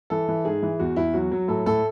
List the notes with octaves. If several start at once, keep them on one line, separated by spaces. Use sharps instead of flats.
E3 A4
E3
G#2 G#4
E3
E2 F#4
E2 E4
F#3 F#4
F#3
A2 A4
A2 A4